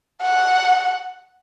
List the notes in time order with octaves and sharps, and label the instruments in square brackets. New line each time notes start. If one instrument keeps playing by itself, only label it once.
[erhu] F#5